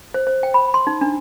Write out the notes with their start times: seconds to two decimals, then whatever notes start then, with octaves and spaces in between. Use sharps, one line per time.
0.14 C5
0.27 C5
0.43 G5
0.54 B5
0.74 C6
0.87 D#4
1.01 D4